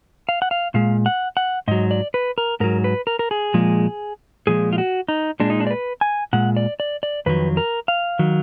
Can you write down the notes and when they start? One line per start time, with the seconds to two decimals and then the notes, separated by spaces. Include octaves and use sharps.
0.29 F5
0.42 F#5
0.51 F5
0.74 A#2 G#3 F5
1.06 F#5
1.37 F#5
1.68 G#2 F#3 D#5
1.91 D5
2.14 B4
2.38 A#4
2.60 G#2 F#3 A#4
2.84 B4
3.07 A#4
3.19 A#4
3.31 G#4
3.54 A#2 F3 G#3
4.47 A#2 F3 G#3 G#4
4.73 F4
4.78 F#4
5.08 D#4
5.40 A#2 G#3 D4
5.50 D#4
5.60 D4
5.67 D5
5.71 B4
6.01 G#5
6.33 A#2 G#3 F#5
6.57 D5
6.80 D5
7.03 D5
7.26 F2 D#3 F#3 B4
7.57 A#4
7.88 F5
8.19 D#3 F#3